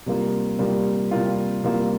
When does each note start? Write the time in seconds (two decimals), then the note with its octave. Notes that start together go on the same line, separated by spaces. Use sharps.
0.06 C3 G3 A#3 F4
0.59 C3 G3 A#3 F4
1.11 C3 G3 A#3 F4
1.64 C3 G3 A#3 F4